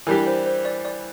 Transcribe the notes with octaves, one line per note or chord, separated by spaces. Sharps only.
E3 G3 D4 G4 A#4
C5
C5
D5
D5